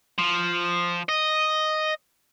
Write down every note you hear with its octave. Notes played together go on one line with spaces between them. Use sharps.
F3
D#5